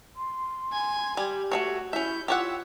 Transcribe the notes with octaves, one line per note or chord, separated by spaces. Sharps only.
C6
G#5 G#6
G3 G4
A3 C4 F#4 C#5
C#4 E4 E5 G6
F4 G4 C#5 F#5 E6